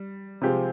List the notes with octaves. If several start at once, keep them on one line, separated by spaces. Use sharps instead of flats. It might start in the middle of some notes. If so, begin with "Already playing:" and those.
Already playing: G3
C3 F3 G#3 C4 G4